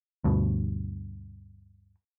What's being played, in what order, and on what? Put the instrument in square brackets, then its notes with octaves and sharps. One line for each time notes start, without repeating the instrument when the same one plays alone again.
[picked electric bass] D2 G2 B2